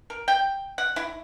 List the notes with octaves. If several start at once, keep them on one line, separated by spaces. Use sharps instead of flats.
A#4
G5
F#5
E4